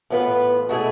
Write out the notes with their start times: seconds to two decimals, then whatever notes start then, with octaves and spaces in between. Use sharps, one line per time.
0.10 A2 E3 B3 F4 B4
0.69 B2 A3 E4 G#4